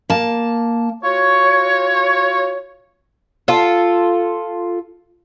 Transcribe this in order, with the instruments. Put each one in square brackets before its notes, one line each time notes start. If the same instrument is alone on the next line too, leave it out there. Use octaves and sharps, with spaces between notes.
[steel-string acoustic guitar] A#3 A5
[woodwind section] F4 F#4 C#5
[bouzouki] F4 A4